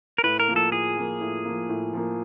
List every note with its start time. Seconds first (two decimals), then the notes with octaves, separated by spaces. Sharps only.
0.18 A#4
0.23 A2 B4
0.40 A#4
0.48 F3 A#3
0.56 A4
0.72 A2 G#4
0.96 F3 A#3
1.21 A2
1.45 F3 A#3
1.69 A2
1.93 F3 A#3